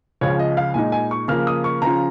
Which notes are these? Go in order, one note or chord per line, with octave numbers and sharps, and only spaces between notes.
C#2 C#3 F3 C#5
D#5
F5
A#2 G#3 D#4 G#5
G#5
C#6
C#3 F3 A#3 F6
D#6
C#6
C#3 F3 C#4 F4 A#5